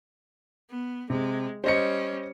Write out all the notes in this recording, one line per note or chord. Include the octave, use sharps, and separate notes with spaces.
B3
C3 G#3
G3 C#4 C5 D#5 C#7